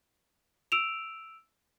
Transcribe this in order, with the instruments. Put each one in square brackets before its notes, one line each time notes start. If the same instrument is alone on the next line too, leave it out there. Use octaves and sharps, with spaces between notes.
[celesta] E6 D7 E7 F7